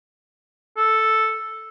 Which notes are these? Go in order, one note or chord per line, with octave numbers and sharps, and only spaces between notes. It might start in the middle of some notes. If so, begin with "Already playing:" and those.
A4